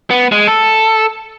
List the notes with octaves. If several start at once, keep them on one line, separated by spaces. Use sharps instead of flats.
B3
G#3
A4